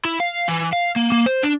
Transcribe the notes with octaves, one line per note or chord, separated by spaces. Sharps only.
E4
F5
E3
F5
A#3
A#3
C5
D4